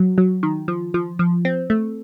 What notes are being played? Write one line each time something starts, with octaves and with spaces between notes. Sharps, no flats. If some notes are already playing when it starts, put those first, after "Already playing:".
Already playing: F#3
F#3
D#3
F3
F3
F3
C4
A3